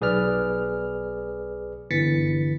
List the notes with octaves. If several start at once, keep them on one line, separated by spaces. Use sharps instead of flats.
B1 G#4 B4 D5 F6
G1 E3 A6 B6 C#7